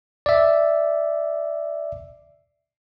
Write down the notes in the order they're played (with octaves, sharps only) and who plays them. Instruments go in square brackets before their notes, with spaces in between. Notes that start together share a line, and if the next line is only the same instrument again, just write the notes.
[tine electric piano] D5 E5